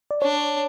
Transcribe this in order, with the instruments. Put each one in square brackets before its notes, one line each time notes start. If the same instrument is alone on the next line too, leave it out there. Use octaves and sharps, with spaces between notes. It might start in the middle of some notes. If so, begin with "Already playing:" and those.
[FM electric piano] D5
[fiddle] D4 [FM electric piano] C#5